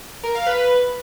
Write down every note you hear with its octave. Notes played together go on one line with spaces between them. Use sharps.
A#4
F5
B4